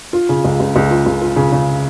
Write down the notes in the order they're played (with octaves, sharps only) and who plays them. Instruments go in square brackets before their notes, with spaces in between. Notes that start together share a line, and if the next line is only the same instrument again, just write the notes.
[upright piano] F4
C#3
C#2
C#2
C#2
F4
C#2
F4
C#3
C#3